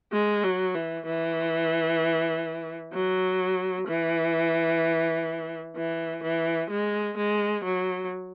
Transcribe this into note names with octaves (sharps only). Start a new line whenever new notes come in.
G#3
F#3
E3
E3
F#3
E3
E3
E3
G#3
G#3
F#3